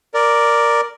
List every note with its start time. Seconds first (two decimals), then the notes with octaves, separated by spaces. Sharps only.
0.14 A#4 D5